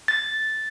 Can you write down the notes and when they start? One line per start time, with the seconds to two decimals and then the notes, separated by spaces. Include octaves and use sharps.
0.08 A6